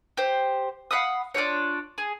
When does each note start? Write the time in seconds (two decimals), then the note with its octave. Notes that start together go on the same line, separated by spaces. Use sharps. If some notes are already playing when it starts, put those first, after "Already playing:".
0.17 G4 C5
0.91 F5 F#5 B5 D#6
1.34 D4 F4 G4 C#5
1.98 G#4